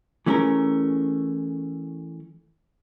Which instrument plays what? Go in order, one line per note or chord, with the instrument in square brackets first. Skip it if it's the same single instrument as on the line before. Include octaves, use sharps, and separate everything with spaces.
[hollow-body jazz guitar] E3 A3 C#4 G#4 A#4